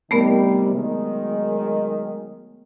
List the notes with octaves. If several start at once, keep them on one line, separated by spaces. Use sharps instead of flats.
C3 D#3 G3 A3 B3 A#4
D#3 F#3 G#3